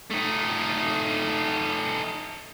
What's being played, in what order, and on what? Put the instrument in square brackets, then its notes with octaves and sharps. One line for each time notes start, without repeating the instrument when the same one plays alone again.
[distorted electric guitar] A3 D#4